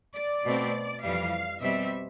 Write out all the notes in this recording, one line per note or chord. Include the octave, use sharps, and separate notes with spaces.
D5
B2 A3 C4
F2 E3 G3 F5
B2 G3 C4 E5